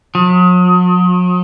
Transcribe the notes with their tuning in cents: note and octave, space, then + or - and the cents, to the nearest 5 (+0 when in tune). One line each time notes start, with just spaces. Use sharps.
F#3 -45